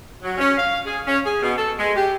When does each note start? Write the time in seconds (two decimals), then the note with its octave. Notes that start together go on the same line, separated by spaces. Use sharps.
0.23 F#3
0.38 C#4
0.57 F5
0.84 G#4
1.06 C#4
1.25 G#4
1.42 B2
1.58 A4
1.77 G#3
1.96 G4